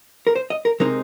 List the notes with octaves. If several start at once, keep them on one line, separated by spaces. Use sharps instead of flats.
A#4
C5
D#5
A#4
C3 G#3 C4 D#4 A#4